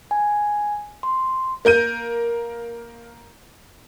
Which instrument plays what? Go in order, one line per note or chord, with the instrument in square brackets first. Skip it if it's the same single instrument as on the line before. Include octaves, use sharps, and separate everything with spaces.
[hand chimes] G#5
C6
[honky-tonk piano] A#3 A#4 G6 D#7